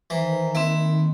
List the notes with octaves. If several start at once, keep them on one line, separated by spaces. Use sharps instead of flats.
D#3 E3 B4 C5 A#5
A#3 C4 E4